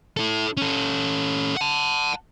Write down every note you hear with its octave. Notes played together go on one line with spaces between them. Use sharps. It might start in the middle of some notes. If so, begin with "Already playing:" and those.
E4 A4
C#4 A4
F#5 A5